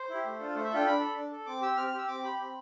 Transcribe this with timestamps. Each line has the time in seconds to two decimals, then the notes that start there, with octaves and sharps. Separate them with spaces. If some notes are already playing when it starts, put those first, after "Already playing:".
Already playing: C5
0.10 E4 G4
0.25 A3
0.40 D4 F4 A4
0.55 A3 C5
0.65 E5
0.71 D4 F4 A4 G5
0.86 D4 B5
1.00 A4
1.16 D4
1.32 A4
1.46 C4 D6
1.61 G4 E6
1.77 C4 F6
1.88 F6
1.93 G4 E6
2.08 C4 D6
2.24 G4 B5
2.39 C4